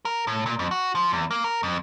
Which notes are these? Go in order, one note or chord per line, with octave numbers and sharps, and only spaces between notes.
A#4
A2
A#2
F2
F#4
F3
E2
A#3
A#4
F2